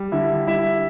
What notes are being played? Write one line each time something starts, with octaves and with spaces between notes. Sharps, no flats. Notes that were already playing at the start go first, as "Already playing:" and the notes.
Already playing: G3
D3 E4 E5
G3 E4 E5